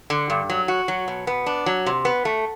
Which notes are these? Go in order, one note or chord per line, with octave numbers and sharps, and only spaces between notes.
D3
G2
F#3
F#4
F#3
B2
B3
D4
F#3
C3
B3
A3